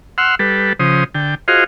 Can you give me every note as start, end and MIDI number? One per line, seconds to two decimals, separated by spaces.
0.18 0.35 78
0.18 0.35 84
0.18 0.35 88
0.18 0.35 89
0.39 0.73 55
0.39 0.73 69
0.39 0.73 71
0.80 1.04 49
0.80 1.04 53
0.80 1.04 72
0.80 1.04 87
1.15 1.35 50
1.15 1.35 79
1.48 1.64 65
1.48 1.64 66
1.48 1.64 68
1.48 1.64 72
1.48 1.64 75
1.48 1.64 77